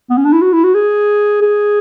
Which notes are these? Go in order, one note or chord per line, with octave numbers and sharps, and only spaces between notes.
B3
C#4
D4
E4
F#4
E4
F#4
G#4
G#4